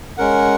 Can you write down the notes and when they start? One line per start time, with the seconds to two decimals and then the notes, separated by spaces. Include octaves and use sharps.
0.18 G#3 C#4 A#4 F#5